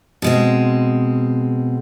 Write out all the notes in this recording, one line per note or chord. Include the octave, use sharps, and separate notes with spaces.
B2 G#3 C4